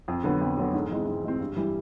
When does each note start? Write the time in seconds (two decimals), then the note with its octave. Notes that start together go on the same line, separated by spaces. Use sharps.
0.08 F2
0.24 D3 F#3 B3
0.41 F2
0.58 D3 F#3 B3
0.74 G#2
0.91 E3 G#3 C4
1.07 G#2
1.23 E3 G#3 C4
1.40 G2
1.57 E3 G3